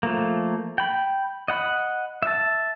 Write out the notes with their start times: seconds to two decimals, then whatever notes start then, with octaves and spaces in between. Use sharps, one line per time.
0.03 F3 A3 A#3
0.78 G5 B5
1.48 D#5 F#5 B5
2.23 E5 A5